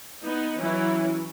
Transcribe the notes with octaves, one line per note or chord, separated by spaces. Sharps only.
B3 D#4
E3 F#3 C#4 E4